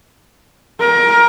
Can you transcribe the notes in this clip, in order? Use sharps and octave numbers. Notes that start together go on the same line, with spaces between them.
A#4